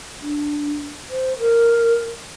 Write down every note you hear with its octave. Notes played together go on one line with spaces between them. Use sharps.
D4
C5
A#4